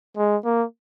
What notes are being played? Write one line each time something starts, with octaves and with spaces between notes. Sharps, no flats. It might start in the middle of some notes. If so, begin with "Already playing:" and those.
G#3
A#3